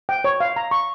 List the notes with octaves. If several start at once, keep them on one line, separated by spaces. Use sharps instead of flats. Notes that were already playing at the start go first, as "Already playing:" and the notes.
G5
C#5
F5
A#5
C#6